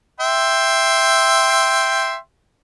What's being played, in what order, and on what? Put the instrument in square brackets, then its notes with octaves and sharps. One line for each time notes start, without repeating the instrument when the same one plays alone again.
[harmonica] E5 G5 C6